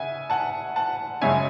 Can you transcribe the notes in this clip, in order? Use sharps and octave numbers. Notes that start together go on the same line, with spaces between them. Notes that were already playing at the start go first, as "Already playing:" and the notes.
Already playing: C#3 E5 F#5 G#5
F#5 A5
F#5 A5
F#2 C#3 G#3 C#4 E5 G#5